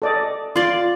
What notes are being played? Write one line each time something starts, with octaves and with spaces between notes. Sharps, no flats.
A4 D5 D#5
F4 D5 C6